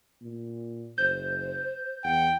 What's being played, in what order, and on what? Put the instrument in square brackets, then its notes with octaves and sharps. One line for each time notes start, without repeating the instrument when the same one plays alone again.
[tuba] A#2
[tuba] F#1 [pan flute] C5 [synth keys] G6
[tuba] E2 [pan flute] F#5 [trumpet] G5